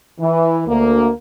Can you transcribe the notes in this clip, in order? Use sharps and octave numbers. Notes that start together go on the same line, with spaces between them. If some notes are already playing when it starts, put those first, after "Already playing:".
E3
D2 A#3